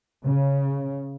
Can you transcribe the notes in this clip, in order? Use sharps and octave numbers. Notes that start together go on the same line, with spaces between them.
C#3